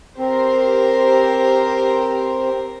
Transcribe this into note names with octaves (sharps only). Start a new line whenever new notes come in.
C4 G4 A#4 C5